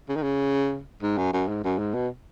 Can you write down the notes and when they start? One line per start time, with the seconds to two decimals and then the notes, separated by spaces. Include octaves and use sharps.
0.09 C#3
0.16 D#3
0.23 C#3
1.02 G#2
1.18 F#2
1.33 F#2
1.48 G#2
1.64 F#2
1.78 G#2
1.94 B2